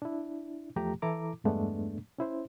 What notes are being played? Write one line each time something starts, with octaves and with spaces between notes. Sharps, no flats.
D4 E4
E2 F3 A3 G4 A#5
E3 E4 A4 A#5 D6
E2 G2 G#3 A3 B3 D4
C#4 E4 C5